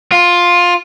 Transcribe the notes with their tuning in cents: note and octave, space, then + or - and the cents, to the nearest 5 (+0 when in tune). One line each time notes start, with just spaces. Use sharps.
F4 +10